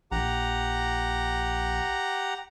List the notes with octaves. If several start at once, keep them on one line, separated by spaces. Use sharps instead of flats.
A#1 G4 F#5 A#5